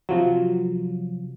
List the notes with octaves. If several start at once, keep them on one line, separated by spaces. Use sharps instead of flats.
C3 F3 F#3